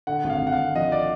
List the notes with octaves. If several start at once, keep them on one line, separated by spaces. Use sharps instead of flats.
D3 F#5
G#1
F5
G#1
F#5
F5
G#1
F3 D#5
D5